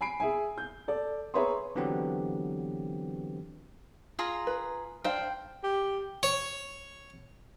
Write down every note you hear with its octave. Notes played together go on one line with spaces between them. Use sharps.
G#5 B5 C7 D7
G#4 E5 G#5
G6
A4 D5
G#4 B4 C#5 E5 A#5 C6
D3 E3 F#3 B3 C4 G4
F4 G#4 A#5
B4
D4 C5 F5 G5
G4
C#5